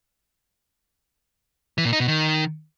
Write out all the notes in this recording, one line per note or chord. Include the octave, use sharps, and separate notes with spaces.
E3
A#2
D#4
B2
D#3